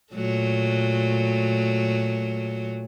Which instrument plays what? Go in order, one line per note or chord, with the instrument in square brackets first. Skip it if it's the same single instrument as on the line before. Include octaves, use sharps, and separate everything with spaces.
[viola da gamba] A#2 F#3 A3